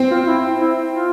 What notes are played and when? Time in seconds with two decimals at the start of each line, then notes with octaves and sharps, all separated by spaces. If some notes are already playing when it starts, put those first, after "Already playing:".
Already playing: C4
0.11 F4
0.27 E4
0.61 E4
0.94 F4